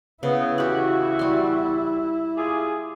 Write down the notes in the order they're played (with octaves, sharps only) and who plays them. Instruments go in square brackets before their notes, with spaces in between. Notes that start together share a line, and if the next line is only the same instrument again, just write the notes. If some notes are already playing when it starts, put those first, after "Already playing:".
[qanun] C#3 [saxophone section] B3 [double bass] E4
[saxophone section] E2 F#4 [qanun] G4 F#5
[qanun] G3 C6
[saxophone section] F4 G4 G#4